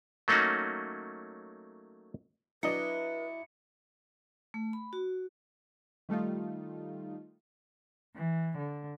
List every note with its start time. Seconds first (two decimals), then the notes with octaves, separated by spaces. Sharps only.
0.28 F#3 A3 A#3 C#4 D#4 F#4
2.63 F#3 D4 E4 B4 D#5 C#7
4.54 A3
4.73 B5
4.93 F#4
6.09 D#3 G3 A3 D#4 F4
8.16 E3
8.57 D3